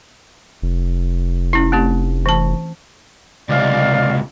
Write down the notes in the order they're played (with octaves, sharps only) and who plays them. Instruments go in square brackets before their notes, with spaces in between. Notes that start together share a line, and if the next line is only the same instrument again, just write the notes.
[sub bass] F1
[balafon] C#4 E4
A3 C4 G4
E3 A5
[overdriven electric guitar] C#2 C3 [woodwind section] D5 D#5 F5